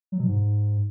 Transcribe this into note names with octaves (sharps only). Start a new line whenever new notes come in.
F#3
B2
G#2